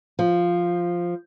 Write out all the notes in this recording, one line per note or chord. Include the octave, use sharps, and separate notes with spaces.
F3